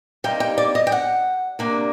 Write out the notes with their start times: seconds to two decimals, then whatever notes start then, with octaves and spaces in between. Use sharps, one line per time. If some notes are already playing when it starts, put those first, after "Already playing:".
0.24 C3 G3 A#3 D#4 G5
0.40 G5
0.58 D5
0.75 D#5
0.87 G5
0.92 F#5
1.59 C3 G3 A#3 D4